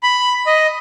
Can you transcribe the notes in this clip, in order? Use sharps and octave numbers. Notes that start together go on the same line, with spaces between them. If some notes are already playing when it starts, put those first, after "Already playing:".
B5
D#5